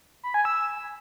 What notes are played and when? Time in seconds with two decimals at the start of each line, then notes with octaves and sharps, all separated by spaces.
0.23 B5
0.34 G#5
0.45 E6